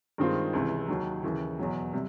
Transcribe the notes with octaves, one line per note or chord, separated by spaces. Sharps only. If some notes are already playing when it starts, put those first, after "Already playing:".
G2 D#3 G#3 C4 F4
C#2 C3 E3
D#2 D#3 F#3
D#2 C#3 E3
E2 B2 F#3
C3 G3